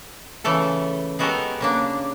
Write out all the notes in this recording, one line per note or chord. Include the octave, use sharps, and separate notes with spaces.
C#3 E3 A3 A4
G#3 B3 F#4 G4 A4 A#4
C#3 A#3 D4